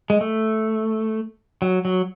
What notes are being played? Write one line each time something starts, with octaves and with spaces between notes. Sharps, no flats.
G#3
A3
F#3
F#3